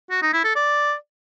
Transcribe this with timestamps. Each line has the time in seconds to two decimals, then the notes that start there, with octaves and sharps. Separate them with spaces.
0.11 F#4
0.22 D#4
0.33 E4
0.45 A4
0.56 D5